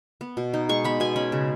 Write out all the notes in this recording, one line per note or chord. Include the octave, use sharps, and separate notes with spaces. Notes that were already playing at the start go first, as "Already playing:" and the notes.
B3
B2
D#4
G#3 C#6
B3 B5
B2 G#5
C#4 B5
C#3